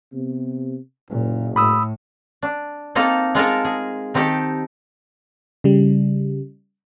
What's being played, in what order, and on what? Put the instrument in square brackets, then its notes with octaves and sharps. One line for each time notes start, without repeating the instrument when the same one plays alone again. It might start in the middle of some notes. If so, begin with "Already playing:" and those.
[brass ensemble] C3 B3
[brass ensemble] F#1 [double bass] A#2
[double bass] A2 [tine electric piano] B5 D#6 E6
[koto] D4
A#3 C4 D#4 F4 A4
G#3 F4 A4 A#4
G#4
D#3 C4 D#4 G4 A4
[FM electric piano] C#3 G3